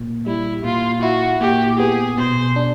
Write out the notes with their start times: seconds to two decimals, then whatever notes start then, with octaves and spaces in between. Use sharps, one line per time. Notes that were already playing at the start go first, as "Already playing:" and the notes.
Already playing: A#2
0.26 G3 E4
0.64 A#2 F4
1.02 E4 F#4
1.41 A#2 G4
1.79 B3 G#4
2.18 B2 C5
2.56 D4